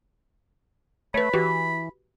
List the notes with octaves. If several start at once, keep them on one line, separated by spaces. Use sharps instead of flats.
A3 B4 C#5 B5
E3 F#4 G4 B4